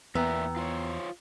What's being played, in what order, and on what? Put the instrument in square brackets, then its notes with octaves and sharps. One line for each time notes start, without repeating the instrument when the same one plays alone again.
[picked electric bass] E2 [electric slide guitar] A#2 A#4 E5 [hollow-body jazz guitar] B3 [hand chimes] G5 A#5 E6
[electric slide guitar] F4 C5 C#5